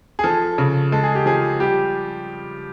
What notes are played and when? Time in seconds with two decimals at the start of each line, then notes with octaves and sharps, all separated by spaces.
0.19 G#4
0.24 F3 A4
0.58 C#3
0.92 G#3 A4
1.03 G#4
1.15 G4
1.26 F3 G#4
1.60 G3 G4